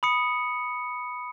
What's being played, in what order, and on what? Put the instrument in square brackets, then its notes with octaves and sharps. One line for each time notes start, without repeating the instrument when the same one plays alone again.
[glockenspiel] B5 D#6 C#7